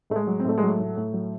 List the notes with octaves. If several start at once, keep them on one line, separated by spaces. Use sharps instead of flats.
A2 A3
G#3
F#3
C4
A2 A3
G#3
F#3
A3
A2
A2
F#3